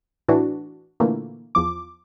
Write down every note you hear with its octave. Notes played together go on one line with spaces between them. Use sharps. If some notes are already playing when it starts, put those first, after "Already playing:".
A2 E3 D4 F#4
A#2 D3 E3 A3 A#3
E2 F3 D6